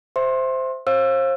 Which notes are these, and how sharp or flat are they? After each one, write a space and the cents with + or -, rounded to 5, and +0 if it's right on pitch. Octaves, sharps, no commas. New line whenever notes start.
C5 -5 E5 +0 C6 +25
C5 +40 F5 +0 E6 +25